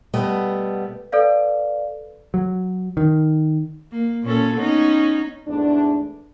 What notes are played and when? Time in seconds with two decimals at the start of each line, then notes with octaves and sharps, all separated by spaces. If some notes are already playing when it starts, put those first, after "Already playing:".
0.14 B2 G3 A3 B3 D#5 E5
1.12 A4 B4 D5 F5
2.34 F#3
2.97 D#3
3.92 A#3
4.23 A#2 C#4 A4
4.55 B3 C#4 D#4
5.48 E2 G#2 A3 D4